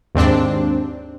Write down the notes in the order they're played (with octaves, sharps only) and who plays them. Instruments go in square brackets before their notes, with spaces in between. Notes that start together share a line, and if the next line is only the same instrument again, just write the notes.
[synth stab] D#2 G#2 C4 D4